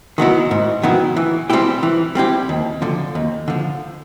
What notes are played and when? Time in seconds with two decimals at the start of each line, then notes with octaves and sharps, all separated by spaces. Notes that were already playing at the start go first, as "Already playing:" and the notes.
0.18 D#3 F#3 B3 E4
0.51 G#2
0.83 D#3 F#3 B3 E4
1.17 E3
1.50 G3 C4 E4 G4
1.83 E3
2.15 G3 C4 E4 G4
2.49 D#2
2.82 D3 F3
3.15 D#2
3.48 D3 F3